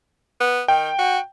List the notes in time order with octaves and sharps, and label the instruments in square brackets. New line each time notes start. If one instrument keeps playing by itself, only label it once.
[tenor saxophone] B3
[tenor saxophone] D#3 [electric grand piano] G5
[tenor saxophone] F#4